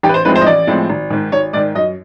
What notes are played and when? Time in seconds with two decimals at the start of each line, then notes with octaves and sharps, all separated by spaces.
0.03 A1 G4
0.09 B4
0.14 C5
0.25 A2 F3 G#3 C4 B4
0.35 C5
0.41 D#5
0.46 A1 D5
0.67 A2 F3 G#3 C4
0.90 G#1
1.10 G#2 D#3
1.32 G#1 C#5
1.53 G#2 D5
1.57 D#3
1.75 F#2 D#5